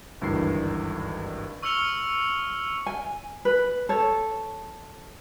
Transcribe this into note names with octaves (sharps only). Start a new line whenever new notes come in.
G#1 D2 G2 D#3 E3 C7
C#6 E6 F6 C#7 F7 G7
G#5
B4
A4 C#5